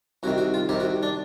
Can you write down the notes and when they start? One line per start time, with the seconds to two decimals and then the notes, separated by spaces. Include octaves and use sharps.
0.23 C2 C3 D#3 F#4
0.38 F#4
0.54 F4
0.69 C2 C3 D#3 G4
0.80 F#4
1.03 D4